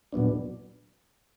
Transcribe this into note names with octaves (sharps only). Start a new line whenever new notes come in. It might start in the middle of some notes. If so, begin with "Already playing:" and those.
A#2 F#3 B3 D4